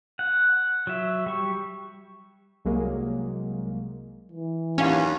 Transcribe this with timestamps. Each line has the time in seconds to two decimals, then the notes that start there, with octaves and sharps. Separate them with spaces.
0.19 F#5
0.87 F#3 E5
1.26 G3 C#6
2.65 C2 F#3 G#3 A#3
4.32 E3
4.78 D#2 F#3 C#4 D4 F5